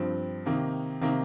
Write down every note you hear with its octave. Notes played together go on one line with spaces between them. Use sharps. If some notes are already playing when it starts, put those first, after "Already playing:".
Already playing: G2 F3 C4
C3 D#3 A#3 D#4
C3 D#3 A#3 D#4